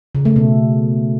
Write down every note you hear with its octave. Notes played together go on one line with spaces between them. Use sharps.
C#3
A3
B2